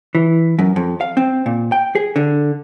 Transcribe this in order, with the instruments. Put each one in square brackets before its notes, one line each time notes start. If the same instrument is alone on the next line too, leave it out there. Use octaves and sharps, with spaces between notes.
[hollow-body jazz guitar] E3
F#2
F2
F5
C4
A#2
G5
G#4
D3